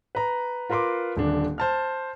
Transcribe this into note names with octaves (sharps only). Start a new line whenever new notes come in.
B4 A#5
F4 A#4 B4 C6 D6
D#1 D3 D4
C5 A5 F6